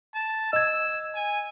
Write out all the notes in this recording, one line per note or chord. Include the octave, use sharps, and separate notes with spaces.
A5
D#5 E6 G#6
G#5